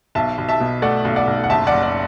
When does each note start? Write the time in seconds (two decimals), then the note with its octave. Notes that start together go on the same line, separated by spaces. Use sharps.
0.15 B1 E5 A5
0.38 B1
0.49 E5 A5
0.60 B2
0.82 A3 D5 F#5
1.05 B1
1.16 D5 F#5
1.27 B1
1.44 F#5
1.50 F#1 E5 A5
1.67 D5 F#5
1.72 F#1
1.83 D5